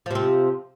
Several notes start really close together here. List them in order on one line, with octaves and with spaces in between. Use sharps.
F3 C3 C4